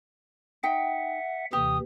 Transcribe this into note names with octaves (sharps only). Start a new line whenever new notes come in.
D#4 E5 F#5 G5
D#2 C3 E3 G4 D#6